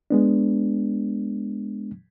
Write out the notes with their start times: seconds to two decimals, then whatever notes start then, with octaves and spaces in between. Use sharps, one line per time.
0.10 G#3 B3 D4